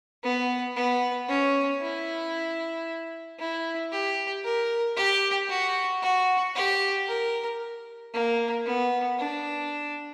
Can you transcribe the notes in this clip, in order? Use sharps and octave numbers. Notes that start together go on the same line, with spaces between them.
B3
B3
C#4
E4
E4
G4
A#4
G4
F#4
F#4
G4
A#4
A#3
B3
D4